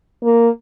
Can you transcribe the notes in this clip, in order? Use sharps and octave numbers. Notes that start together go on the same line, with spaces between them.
A#3